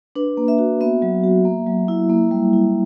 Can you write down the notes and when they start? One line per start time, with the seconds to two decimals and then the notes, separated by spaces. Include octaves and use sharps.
0.16 D4 B4
0.37 A#3
0.48 E5
0.58 F#4
0.81 B3 E5
1.02 F#3
1.24 F#4
1.45 A#3
1.66 F#3
1.88 E4
2.10 A#3
2.31 G3
2.53 E4